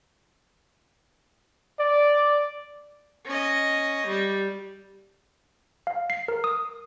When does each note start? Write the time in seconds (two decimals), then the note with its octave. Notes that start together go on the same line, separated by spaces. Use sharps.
1.79 D5
3.26 C#4 D#5
4.07 G3
5.87 F5
6.10 C7
6.28 A#4
6.44 D#6